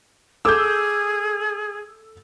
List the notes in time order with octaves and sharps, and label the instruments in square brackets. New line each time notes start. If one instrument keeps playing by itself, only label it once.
[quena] G#4 [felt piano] A4 D6 [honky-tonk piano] E6 G6